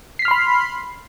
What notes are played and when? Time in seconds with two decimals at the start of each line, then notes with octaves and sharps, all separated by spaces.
0.19 C7
0.22 B6
0.25 F6
0.28 C6
0.31 B5